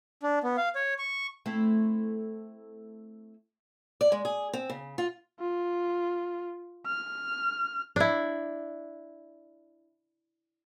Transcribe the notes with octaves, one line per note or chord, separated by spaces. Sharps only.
D4
B3
F5
C#5
C#6
A3 C4 E4
D5
G#3
G#4
C4
C#3
F4
F4
F6
D4 E4